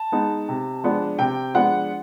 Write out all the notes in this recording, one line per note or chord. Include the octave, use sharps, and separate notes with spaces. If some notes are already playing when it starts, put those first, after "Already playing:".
Already playing: A5
G#3 B3 D#4
C3
F3 G#3 B3 D4
C3 G5
F3 G#3 B3 D4 F#5